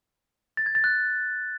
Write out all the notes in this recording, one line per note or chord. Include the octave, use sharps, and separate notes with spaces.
A6
G#6
A6
F#6